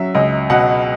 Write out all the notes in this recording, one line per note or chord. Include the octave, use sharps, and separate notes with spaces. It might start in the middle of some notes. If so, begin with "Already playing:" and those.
Already playing: F#3 C#4 E5
C#2 D#5
B2 F#5